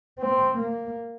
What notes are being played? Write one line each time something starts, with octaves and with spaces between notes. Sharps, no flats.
C4
A#3